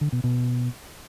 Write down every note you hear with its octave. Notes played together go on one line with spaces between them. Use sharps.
D3
B2
B2